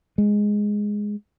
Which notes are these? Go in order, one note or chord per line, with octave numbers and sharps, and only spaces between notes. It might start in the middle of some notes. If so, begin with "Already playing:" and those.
G#3